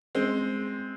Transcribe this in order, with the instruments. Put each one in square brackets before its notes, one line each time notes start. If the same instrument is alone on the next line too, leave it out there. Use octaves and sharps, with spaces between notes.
[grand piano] G#3 C4